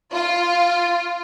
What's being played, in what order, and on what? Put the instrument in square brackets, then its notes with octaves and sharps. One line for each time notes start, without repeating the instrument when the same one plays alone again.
[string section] F4